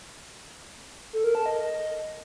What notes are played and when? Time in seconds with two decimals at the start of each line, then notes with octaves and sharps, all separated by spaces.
1.13 A4
1.24 A#4
1.35 A5
1.46 D#5